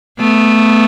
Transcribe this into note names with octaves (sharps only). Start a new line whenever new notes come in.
A3 B3